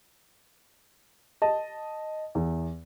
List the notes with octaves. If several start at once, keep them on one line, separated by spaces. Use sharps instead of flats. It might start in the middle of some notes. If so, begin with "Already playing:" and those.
D#5 A5
E2